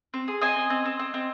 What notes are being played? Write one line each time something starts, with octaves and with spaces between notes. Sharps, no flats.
C4
G#4
C4 D#5 G#5
C4
C4
C4
C4
C4